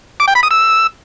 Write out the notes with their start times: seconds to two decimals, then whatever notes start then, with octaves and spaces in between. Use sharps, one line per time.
0.20 D6
0.28 G5
0.35 B5
0.43 D#6
0.51 E6